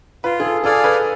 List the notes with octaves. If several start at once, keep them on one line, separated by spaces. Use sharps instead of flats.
F4 B4
G#4
A4
G#4 A4 D5 F5 G#5
B4